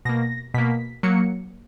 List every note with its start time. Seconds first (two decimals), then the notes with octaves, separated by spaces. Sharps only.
0.05 B2 A#3 A#6
0.54 B2 A#3 B6
1.03 F#3 A#3 C#7